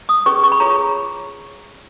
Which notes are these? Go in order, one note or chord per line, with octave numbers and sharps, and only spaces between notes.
D#6
C#4 G#4 B4 C#6
C#6
B5
F4 G#4 C#5 A#5